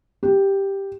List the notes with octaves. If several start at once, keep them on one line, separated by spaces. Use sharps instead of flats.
G4